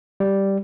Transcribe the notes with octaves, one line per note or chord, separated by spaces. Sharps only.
G3